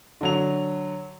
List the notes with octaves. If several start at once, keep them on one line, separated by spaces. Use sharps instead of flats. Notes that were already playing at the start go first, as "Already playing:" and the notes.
D3 F#3 F7